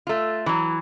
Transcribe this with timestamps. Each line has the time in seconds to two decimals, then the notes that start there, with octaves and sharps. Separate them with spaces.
0.07 A3 F4
0.46 E3 F#3